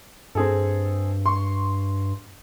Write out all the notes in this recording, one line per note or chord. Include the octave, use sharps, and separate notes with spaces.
G2 C4 G#4 A4
C6 C#6